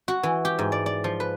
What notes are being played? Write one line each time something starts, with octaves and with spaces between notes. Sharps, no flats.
F#4
E3
G4
G#2
D5
D5
F3
B4